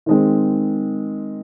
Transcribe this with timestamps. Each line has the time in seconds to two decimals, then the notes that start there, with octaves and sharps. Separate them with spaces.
0.06 D#3 G#3 C4